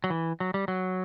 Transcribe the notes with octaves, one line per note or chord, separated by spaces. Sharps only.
F#3
E3
F#3
G3
F#3